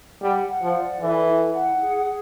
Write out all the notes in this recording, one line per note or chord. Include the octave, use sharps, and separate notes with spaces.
G3 F#5
F#5
F3
D5
E3 A4
E4
F#5
G#4
G#4